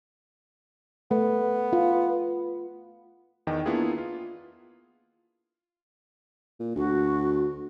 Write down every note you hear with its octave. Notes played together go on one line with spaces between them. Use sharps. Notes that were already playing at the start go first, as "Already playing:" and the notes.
A3 B3
F4
E2 D#3 D#5 G5
A#3 B3 D4 E4 F4 G#4
F4
A#2
D2 F#4